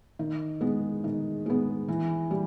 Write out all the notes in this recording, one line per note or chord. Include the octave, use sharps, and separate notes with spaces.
D#3
G#3 B3
D#3
G#3 B3
E3
G3